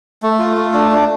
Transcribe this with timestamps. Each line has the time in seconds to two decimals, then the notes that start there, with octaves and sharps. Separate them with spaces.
0.22 A3
0.39 F4
0.57 A3
0.73 D4
0.91 D4